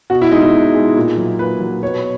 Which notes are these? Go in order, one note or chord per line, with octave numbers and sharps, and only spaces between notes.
B2 F#4
E4
G#3 D#4
E4
B2
G#3
A#2
F#3
A#2 B4
F#3
B2 C#5